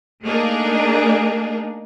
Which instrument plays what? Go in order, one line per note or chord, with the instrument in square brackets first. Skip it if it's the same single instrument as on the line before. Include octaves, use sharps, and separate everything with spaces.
[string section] A3 A#3 D4 D#4 G#4 A#4